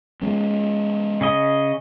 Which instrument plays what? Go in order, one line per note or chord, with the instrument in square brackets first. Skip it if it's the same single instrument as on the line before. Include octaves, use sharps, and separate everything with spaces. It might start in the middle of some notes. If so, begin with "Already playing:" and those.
[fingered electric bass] G#3 B3 C#4
[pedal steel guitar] C#3 C#4 D#5